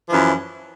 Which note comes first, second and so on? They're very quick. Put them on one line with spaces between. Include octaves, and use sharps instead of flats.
F3 E3 F#2